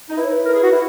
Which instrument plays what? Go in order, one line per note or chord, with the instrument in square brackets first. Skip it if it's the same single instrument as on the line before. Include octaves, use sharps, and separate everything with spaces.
[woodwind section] D#4
[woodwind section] E4 [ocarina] B4
[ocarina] C#5
B4
[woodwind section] A#4
G#4
F#4
E4